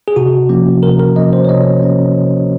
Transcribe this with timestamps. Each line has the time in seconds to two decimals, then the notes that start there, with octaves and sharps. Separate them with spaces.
0.08 G#4
0.16 C3 F#4
0.49 F3 A#3 C#4
0.83 C3 A#4
1.00 A#4
1.16 F3 A#3 C#4 D#5
1.33 C5
1.45 C#5
1.49 C3 D#5
1.82 F3 A#3 C#4
2.16 C3